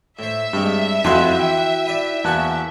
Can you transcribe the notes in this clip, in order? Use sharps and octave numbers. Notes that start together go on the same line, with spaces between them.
A2 C5 E5
G2 G#3 C4 G4
F2 E4 F#4 D#5 F5 B5 C6 F#6
E3 G5
B4 D5
E2 A#3 F#4 A5 C#6 F#6